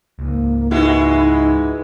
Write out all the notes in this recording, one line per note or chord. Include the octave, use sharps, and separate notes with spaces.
C#2 G#2 A#3
E3 G#3 D#4 E4 F#4